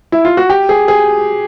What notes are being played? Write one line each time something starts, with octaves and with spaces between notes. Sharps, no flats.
E4
F4
F#4
G4
G#4
G#4